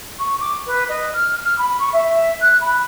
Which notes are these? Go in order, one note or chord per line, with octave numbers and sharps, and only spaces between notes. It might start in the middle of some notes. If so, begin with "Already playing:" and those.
C#6
D6
B4
D#5
F6
F6
B5
C#6
E5
F#6
B5